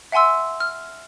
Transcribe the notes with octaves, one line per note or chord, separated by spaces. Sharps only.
E5 F#5 G#5 C6 E6
F6